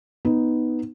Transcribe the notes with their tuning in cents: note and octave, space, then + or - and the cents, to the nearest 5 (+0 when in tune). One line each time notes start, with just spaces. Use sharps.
B3 +0 D#4 +0